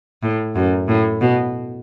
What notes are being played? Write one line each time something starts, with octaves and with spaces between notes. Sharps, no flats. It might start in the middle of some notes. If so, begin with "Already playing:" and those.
A2
F#2
A2
B2